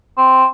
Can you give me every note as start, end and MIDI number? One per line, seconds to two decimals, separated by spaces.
0.17 0.46 60